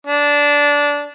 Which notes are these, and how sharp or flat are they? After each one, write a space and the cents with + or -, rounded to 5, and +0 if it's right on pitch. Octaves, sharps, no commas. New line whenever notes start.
D4 -15